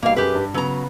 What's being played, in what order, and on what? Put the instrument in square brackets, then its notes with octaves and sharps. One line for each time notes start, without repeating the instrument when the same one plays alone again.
[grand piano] B1 B2 G3 [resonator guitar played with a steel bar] A#3 F5
[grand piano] F#2 G#4 [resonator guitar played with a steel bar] G4 B4
[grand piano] G2
[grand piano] C#3 B3 [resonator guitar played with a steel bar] F#3 A#5